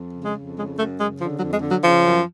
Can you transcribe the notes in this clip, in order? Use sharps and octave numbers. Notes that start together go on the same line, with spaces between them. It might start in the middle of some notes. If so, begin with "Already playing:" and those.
Already playing: F2
C#3
G#3
F2
C#3 G#3
F#2 A3
C#3 G#3
D3 F3
F#3
F2
G#3
D3
F#3
C#3 F3
F#2